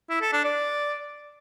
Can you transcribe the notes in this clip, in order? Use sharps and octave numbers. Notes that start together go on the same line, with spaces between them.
E4
A4
D4
D5